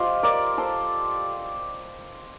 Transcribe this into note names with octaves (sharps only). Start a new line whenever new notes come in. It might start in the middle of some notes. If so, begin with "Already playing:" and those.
Already playing: F4 G4 C5 D#5
A#4 D5
A4 C5